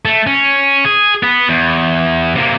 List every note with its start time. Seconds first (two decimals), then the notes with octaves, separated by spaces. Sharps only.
0.05 A3
0.27 C#4
0.85 G#4
1.23 B3
1.49 E2
2.36 C3 A#3